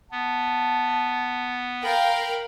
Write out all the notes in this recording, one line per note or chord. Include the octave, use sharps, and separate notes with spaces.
B3 A5
A#4 F5 G5 B5